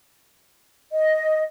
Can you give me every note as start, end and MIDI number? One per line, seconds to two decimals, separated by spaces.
0.92 1.44 75